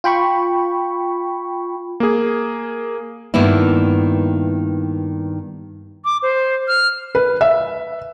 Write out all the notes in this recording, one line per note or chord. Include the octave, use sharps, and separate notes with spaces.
F4 G5 B5 C#6
A#3 G#4
G2 D#3 A#3 B3 E4
D6
C5
F6
B4
E5